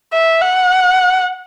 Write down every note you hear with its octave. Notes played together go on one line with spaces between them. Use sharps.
E5
F#5